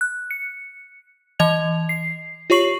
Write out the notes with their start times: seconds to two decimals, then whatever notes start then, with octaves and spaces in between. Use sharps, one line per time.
0.01 F#6
0.31 C#7
1.39 E3 D#5 G#6 F7
1.89 C7
2.50 F4 G4 C#5 C#6 C7 F#7